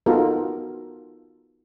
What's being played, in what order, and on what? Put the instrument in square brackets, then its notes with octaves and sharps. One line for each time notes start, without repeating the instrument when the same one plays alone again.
[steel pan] B3 D#4 F4 F#4 A4 A#4